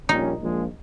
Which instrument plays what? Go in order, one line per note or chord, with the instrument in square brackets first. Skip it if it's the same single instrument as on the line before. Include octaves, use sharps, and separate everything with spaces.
[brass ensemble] A#1 A#2 G3 C#4 [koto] D#4
[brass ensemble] A#1 A#2 F3 G#3